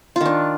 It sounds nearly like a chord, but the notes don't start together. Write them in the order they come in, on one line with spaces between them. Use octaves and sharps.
F4 D#3 D4